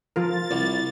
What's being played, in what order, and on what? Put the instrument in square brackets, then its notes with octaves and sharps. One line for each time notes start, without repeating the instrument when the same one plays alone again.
[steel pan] F3 F4 A#4 [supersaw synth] A6
[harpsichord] C2